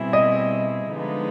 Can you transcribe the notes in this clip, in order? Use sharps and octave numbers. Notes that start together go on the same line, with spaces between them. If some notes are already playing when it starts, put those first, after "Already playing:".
Already playing: B2 G3 C4 E4 G#4
D#5
D3 F3 G#3 B3 D#4